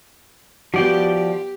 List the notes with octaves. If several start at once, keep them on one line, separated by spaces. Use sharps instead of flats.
F3 B3 F#4 G4 D5 G5
G4